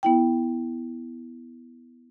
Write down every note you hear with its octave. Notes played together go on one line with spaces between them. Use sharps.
B3 E4 G5